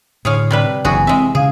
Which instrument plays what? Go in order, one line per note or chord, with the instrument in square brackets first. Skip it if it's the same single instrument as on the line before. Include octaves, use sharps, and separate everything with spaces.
[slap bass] A2 D3 [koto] G#4 C#5 F5
[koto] C3 G3 B4
[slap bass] F#1 [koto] E3 F#4 G#4 [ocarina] G#5
[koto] G#3 E5 [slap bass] C4
[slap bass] C#3 [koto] G#4 [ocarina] F5